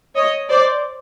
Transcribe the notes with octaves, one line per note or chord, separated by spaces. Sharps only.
C#5 D#5
C5 D5